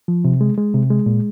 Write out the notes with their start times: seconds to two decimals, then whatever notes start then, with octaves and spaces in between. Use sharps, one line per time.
0.08 F3
0.25 C3
0.41 G#3
0.57 G#3
0.74 C3
0.90 G#3
1.06 A#2